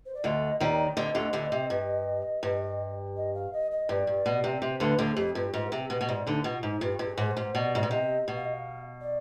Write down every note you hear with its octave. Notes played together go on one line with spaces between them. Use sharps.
C5
D5
D2 D3 D#5
D#2 D#3 D5
D2 D3 D#5
D2 D3
D2 D3
C3
G2
G2
D#5
F5
D#5
D#5
G2 D5
G2
B2
C3
C3 C5
D2 D3 B4
D2 D3
G#4
F2 G4
G2 F4
G4
G#2 F4
B4
C3 G#4
B2 B4
B2
G#2 D5
D2 D3 D#4
B2 F4
G#2 D#4
G2 F4
G2
G#4
G#2
C5
G#2
B2 D5
G#2
B2
C3 D#5
B2
F5
D#5
F5
D5